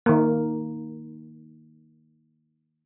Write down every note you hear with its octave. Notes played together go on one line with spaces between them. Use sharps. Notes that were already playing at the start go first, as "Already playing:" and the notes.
D#3 A#3